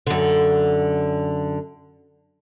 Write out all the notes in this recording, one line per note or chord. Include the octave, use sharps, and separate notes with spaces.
F#2 D3